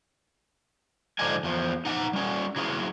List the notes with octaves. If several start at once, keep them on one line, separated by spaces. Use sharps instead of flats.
G#2 D3 F3 D4 D#4 G#5
E2 F3
D#4 F#5 G#5 A#5
G3 C#4
F#3 E4 G#4